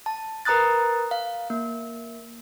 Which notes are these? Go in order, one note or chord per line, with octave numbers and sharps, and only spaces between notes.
A5
A#4 B4 A#5 D#6 F#6 A6
F5
A#3